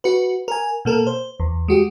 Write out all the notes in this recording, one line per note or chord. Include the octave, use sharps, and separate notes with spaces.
F#4 B4
A#4 G#5
B2 A#3 A4 A#4
C5
E2
G#3 F#4 G4